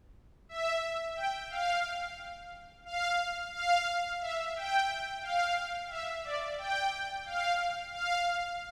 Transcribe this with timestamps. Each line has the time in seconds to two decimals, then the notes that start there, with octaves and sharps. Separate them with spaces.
0.49 E5
1.16 G5
1.50 F5
2.86 F5
3.54 F5
4.21 E5
4.56 G5
5.23 F5
5.90 E5
6.24 D5
6.58 G5
7.26 F5
7.94 F5